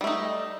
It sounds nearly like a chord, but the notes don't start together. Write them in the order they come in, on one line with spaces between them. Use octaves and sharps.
G3 A3 D#4